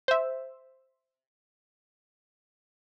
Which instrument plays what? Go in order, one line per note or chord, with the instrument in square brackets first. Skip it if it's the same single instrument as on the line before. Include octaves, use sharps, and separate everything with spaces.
[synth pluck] C5 E5